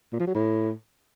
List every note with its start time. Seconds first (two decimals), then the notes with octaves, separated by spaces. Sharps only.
0.13 A#2
0.20 F3
0.27 F#3
0.35 A2